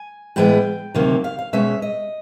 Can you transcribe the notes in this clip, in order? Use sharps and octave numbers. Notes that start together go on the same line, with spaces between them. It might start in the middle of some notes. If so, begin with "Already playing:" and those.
Already playing: G#5
A2 E3 G#3 B3 G5
D2 C3 D#3 F#3 A#3
F5
F5
B2 G#3 C#4 E5
D#5